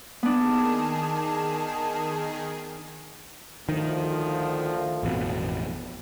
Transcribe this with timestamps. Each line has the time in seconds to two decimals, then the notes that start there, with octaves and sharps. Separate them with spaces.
0.23 D#3 B3 D4 G#4 A5
3.69 D2 D3 D#3 F3
5.03 A1 F2 B2